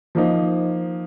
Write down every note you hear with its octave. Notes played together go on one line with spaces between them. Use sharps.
F3 A#3 D#4